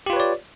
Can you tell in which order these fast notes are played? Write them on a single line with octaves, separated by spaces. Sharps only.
G4 F4 B4 C#5 D5